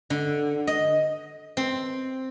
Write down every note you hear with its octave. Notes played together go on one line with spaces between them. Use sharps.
D3
D#5
C4